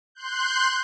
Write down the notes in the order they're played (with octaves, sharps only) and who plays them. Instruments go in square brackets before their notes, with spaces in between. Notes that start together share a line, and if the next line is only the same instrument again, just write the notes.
[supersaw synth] C6 F#6 G6